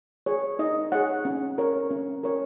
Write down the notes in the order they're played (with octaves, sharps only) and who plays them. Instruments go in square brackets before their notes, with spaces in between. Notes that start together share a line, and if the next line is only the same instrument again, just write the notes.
[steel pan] G#4 C#5
D#4 D#5
G#4 C#5 F#5
C#4
A#4 C#5
C#4
A#4 C#5